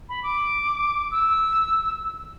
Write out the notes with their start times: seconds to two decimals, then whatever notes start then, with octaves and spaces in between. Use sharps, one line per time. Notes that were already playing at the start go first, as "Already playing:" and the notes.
0.09 B5
0.23 D6
1.11 E6